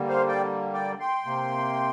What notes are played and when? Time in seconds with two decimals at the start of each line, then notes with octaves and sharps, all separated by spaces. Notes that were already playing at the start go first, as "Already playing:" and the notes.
Already playing: D3 G3 A#3
0.09 C5 F5
0.28 D5 G5
0.73 D5 G5
1.00 G5 C6
1.25 C3 A#3